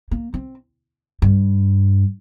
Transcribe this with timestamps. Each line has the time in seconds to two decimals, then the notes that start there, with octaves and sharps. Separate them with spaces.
0.11 A#3
0.34 C4
1.22 G2